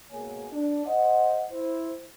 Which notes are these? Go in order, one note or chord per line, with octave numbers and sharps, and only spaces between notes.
G#2 B2 A#3 G#4 C#5 G#5
D4
C5 D#5 F#5
E4 C5